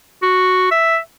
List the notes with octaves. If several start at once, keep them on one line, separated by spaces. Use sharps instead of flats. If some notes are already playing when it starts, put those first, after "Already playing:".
F#4
E5